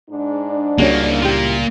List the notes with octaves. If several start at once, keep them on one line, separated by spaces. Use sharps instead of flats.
G#2 D4
C#2 C#3 G3 A#3 C#4 E4 F#4 C#5
A#3 E4 F4 G4